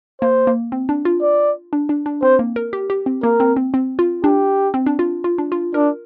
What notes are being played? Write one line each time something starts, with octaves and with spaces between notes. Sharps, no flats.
A#3 C5
A#3
C4
D4
F4
D5
D4
D4
D4
C4 C5
A#3
A#4
G4
G4
C4
A#3 A#4
C4
C4
C4
F4
D4 G4
C4
D4
F4
F4
D4
F4
D4 A#4